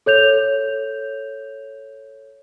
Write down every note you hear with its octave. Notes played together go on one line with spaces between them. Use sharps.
A4 C#5 G6 F7